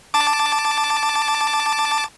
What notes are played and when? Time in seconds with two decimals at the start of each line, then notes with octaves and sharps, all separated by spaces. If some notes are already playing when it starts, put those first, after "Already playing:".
0.14 A5 D6